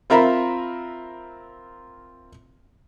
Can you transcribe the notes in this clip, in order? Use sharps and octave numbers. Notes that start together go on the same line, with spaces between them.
C4 F4 A#4 E5 A#5 B5